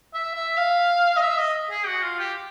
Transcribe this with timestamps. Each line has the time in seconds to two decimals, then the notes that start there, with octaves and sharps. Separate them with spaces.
0.14 E5
0.35 E5
0.57 F5
1.17 D#5
1.22 E5
1.38 D#5
1.71 G#4
1.87 F#4
2.03 F4
2.19 G4